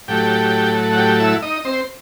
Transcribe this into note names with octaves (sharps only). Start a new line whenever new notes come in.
A2 F#3 A3 G4 G5
F#5
G4 G5
E4 E5
D#4 D#5
D#5
C4 C5